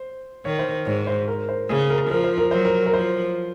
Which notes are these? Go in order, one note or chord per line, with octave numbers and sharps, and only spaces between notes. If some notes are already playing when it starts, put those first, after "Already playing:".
Already playing: C5
D#3 C#5
C5
G#2 C#5
C5
A#4
C5
C#3 G#4
A#4
F3 A#4
C5
A#4
F#3 C5
A#4
A#4
F3 C5